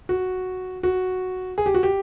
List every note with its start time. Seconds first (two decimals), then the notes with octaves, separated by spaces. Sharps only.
0.09 F#4
0.83 F#4
1.58 G#4
1.66 G4
1.74 F#4
1.83 G4